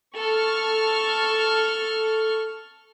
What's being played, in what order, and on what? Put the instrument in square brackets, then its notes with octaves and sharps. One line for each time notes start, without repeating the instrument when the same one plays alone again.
[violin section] A4 C#6 F6